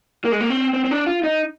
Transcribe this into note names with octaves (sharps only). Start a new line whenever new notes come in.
A#3
G#3
A#3
C4
C4
C4
D4
F4
D#4